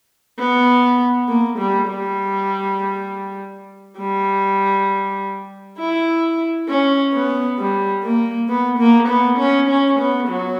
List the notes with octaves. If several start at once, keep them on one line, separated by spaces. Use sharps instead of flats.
B3
A#3
G3
G3
G3
E4
C#4
B3
G3
A#3
B3
A#3
B3
C#4
C#4
B3
F#3